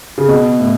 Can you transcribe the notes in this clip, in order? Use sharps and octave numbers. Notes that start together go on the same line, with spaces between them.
C#3
B2
A2